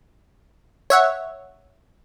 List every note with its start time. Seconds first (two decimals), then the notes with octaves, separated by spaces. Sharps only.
0.90 C#5 E5 F#5